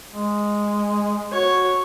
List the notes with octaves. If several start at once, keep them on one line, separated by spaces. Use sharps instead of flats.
G#3
F#4 C#5